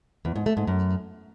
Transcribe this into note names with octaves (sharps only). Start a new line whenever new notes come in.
E2
G#2
A3
G#2
F#2